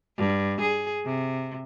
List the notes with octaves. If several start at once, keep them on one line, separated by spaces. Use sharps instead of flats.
G2
G#4
C3